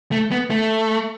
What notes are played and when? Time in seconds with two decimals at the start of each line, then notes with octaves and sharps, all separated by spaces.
0.12 A3
0.31 B3
0.50 A3